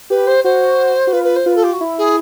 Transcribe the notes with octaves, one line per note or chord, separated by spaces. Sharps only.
G4 B4
C5
F#4 C5
F#4
F4 B4
B4
C5
F4 B4
A4
G4
F#4
E4
G#4